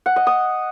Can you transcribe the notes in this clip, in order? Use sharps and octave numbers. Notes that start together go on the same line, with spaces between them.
F#5
D#5
D#6